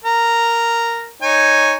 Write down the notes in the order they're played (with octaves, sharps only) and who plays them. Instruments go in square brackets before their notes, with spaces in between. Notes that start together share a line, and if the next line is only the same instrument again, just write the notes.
[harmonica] A#4 A#5
D#4 C#5 G#5